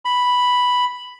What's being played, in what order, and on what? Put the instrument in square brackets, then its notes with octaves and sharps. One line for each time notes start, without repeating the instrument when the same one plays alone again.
[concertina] B5